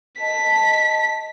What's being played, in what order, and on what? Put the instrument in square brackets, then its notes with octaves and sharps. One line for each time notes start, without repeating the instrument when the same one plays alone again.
[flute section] D#5 A5 [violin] B6